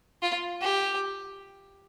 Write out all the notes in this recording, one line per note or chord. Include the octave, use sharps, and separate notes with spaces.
F4
G4